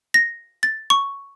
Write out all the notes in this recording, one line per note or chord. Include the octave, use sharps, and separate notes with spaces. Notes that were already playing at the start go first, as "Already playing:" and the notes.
A#6
A6
C#6